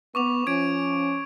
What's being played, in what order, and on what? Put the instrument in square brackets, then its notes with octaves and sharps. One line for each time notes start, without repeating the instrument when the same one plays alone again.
[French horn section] B3 [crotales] C#6 D6 F7
[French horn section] F3 C#4 [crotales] D6 G#6 D7